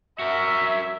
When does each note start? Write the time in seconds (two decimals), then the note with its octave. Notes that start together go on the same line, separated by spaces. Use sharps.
0.19 F#4 A#4 E5